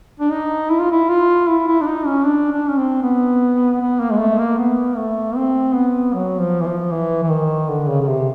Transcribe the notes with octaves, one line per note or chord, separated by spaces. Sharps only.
D4
D#4
E4
F4
E4
F4
E4
E4
D4
D#4
C#4
D4
D4
C#4
C4
B3
B3
A#3
G#3
A3
A#3
B3
A3
C4
B3
F#3
F3
E3
F3
E3
E3
D#3
D3
C#3
C#3
C3